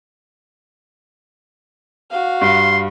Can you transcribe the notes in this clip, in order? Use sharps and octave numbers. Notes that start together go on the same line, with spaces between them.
F#4 F5
G2 C6